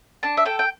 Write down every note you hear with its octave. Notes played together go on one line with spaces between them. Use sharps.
D4 A5
E5
A4 G5
G5